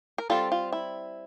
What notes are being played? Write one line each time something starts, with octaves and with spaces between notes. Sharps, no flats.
A#4
G3 C4 F4 A4
F4
E4